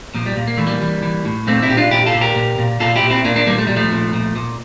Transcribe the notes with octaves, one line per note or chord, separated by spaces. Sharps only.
A#2 F3
G3
A#2
A#3
E3 A3
G3 A#3
E3
E3
A2
A#2 A3 C4
C4 E4
A#2 G4
D4 F4
A#2 E4 G4
F4 A4
A#2
G4 A#4
A#2
A#2
A#2 F4 A4
E4 G4
A#2
C4 E4
A#2 A#3 D4
A#3 D4
A#2 G3 A#3
A3
A#2 G3
F3 A3
A#2
A#2
A#2